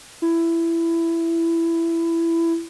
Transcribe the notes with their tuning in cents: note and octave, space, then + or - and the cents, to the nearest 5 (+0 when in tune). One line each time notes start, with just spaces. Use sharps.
E4 +15